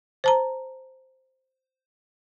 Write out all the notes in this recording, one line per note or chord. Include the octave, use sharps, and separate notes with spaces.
C5 A5 A#5